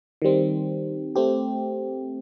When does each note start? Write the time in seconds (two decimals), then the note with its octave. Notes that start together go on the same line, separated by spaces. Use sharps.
0.22 D#3 G3 C4
1.16 A3 C4 G4